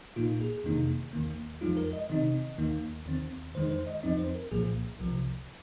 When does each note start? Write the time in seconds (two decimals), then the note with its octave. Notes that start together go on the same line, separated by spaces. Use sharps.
0.16 A#2 A#3 D#4 F4
0.41 G#4
0.64 F2 C3 D#3 A#3 D#4
1.13 D#2 D#3 A#3
1.61 F2 F3 G#3 D#4 F4
1.77 A#4
1.93 D#5
2.10 C3 D#3 C4 D#4 D#5
2.58 D#2 D#3 A#3 D#4
3.06 D#2 D#3 C4
3.55 F2 D#3 G#3 D#4 C5
3.71 C5
3.87 D#5
4.03 F2 F3 C4 D#4 D#5
4.19 C5
4.35 A#4
4.51 C2 A#2 F3 A#3 G#4
5.00 C2 C3 F3